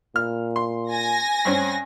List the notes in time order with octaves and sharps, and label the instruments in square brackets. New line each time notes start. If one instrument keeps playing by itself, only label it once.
[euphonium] A#2 [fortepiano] F6
[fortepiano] C6
[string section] G#5 A#6
[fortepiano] G2 C4 C#4